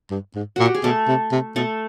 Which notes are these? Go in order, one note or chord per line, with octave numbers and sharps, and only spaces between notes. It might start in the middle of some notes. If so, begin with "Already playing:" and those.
G2
G#2
A#2 F#4
G4
G#4
B2 A3 A4
C3
C3
B2 A3 A4